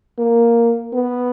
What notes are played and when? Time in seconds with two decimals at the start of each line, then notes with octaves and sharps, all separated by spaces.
0.18 A#3
0.93 B3